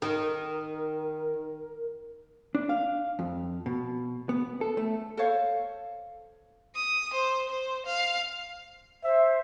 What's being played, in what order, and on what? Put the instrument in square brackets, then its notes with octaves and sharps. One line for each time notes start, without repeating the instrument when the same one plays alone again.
[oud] D#3 [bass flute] A#4
[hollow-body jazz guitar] D4
F5
F2
B2
B3
A4
A3
[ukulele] A4 C5 C#5 F5
[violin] D#6
C5
C5
F5
[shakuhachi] C5 [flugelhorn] E5